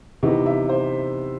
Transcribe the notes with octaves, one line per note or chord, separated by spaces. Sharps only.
C3 E3 B3 D#4
E5
C5